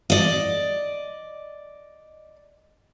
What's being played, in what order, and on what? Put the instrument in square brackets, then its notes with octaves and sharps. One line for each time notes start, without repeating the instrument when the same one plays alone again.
[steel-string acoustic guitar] D5 D#5